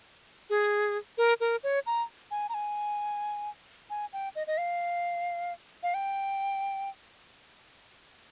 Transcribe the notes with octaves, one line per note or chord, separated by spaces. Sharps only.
G#4
A#4
A#4
C#5
A#5
G#5
A#5
G#5
G#5
G5
D#5
D#5
F5
F5
G5